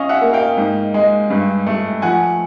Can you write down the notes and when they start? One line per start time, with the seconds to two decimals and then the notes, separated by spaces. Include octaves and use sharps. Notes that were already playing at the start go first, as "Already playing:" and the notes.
Already playing: C#4 D#5 F5
0.09 E5 F#5
0.22 A#3
0.33 F5 G5
0.58 G#2
0.94 G#3
1.30 G2
1.67 A3
2.02 F3 F#5 G#5